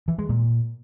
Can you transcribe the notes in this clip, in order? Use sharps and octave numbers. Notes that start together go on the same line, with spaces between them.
E3
G#3
A#2